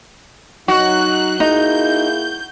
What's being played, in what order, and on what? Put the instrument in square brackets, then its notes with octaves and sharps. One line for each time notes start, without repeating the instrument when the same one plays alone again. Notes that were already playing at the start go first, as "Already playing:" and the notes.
[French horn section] F#3 D#4 [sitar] F#4 [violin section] F#6
[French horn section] A#3 E4 G#4 [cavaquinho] D#4 [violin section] G6